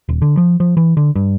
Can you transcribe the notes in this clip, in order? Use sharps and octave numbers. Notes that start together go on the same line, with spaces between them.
D#1
D3
F3
F3
E3
D3
G2